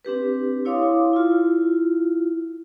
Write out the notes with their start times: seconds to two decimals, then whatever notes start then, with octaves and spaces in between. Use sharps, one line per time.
0.05 C4 D4 G4 B4
0.65 E4 C#5 F5 C6 D6 D#6
1.13 E4 F4